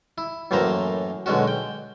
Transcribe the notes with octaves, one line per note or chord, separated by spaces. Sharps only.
E4
F#2 A2 E3 A#3 C5 A#5
B1 D3 G#3 C#4 F#4
G5